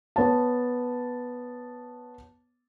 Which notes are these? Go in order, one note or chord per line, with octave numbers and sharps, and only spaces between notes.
B3 C#5 A5